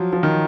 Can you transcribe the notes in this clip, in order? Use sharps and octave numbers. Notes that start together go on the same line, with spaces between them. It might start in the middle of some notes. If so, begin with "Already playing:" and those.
Already playing: F3 F#3
F3
D#3